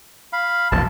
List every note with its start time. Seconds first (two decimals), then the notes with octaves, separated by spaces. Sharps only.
0.33 F5 B5
0.72 E1 A#1 E2 A5